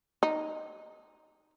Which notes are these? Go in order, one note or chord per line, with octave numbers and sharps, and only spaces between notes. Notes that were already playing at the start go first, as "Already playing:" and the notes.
D#4